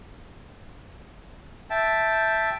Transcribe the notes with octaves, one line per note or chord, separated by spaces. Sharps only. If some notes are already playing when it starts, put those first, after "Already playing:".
E5 G5 A5